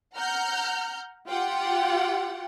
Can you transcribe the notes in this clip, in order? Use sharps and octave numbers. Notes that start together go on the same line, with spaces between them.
F#5 A#5 F6 G6
F4 G4 F#5 G5